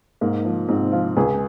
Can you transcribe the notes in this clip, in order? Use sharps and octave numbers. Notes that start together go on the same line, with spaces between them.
G#2 A#3
F3
G#2 C4
F3 F4
C#2 G#4